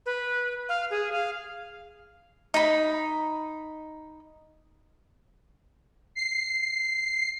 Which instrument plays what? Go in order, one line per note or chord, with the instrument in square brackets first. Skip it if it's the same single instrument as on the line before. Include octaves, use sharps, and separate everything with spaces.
[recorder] B4
F5
G#4
F5
[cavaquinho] D#4 B5
[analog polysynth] C7